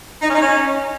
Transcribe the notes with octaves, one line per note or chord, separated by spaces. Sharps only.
D#4
C#4
D#4
C#4